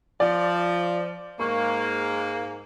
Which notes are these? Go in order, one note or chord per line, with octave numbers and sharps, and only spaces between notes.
F3 D5
G#2 G#3 A#3 C#6